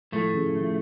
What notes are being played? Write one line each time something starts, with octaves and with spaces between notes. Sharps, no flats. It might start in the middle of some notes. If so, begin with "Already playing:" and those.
A2 F3 A3
C#3
F3